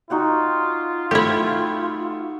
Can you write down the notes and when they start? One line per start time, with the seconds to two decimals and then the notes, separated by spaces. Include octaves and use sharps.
0.10 D#4 F4 F#4 G5
1.11 A3 E4 G4